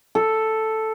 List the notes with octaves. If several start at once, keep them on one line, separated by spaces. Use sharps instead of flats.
A4